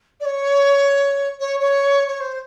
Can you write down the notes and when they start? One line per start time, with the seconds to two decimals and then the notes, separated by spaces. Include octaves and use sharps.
0.20 D5
0.25 C#5
1.40 C#5
1.60 C#5
2.08 C#5
2.20 C5